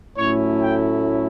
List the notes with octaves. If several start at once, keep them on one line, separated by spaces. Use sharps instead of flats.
A2 F#3 A3 C#4 E4 C#5
G5